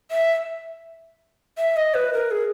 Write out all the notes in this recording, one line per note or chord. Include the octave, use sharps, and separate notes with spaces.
E5
E5
D#5
B4
A#4
G#4